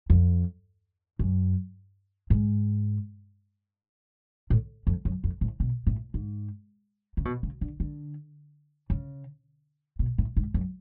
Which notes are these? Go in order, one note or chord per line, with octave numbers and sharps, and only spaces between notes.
F2
F#2
G#2
A2
F2
F#2
F2
A2
B2
A2
G#2
C#3
B2
C#3
D3
D3
C#3
B2
A2
G#2
F#2